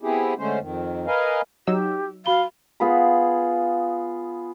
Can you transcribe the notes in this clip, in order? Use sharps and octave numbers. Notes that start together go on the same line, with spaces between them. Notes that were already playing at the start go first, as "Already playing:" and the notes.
B3 C4 E4 G4 G#4
D3 G#3 A3 C#4 C5
F2 D#3
A#4 B4 D#5 F5 G#5
F#3 D#4 G4 E6
F#4 F5 B5 G7
B3 F4 G#4 B5